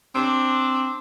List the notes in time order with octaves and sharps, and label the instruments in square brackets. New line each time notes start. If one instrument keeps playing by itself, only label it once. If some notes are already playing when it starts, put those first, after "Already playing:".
[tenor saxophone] C4 [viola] D4